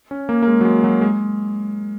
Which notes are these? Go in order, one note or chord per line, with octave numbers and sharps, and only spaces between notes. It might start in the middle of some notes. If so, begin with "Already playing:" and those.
C#4
A#3
A#3
G#3
F#3
G#3
F#3
G#3